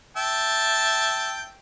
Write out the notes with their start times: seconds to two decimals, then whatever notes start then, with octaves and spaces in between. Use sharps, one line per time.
0.17 E5 G5 A5